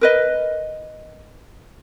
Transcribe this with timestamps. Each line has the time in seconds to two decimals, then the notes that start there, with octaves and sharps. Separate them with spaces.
0.01 A#4 B4 D#5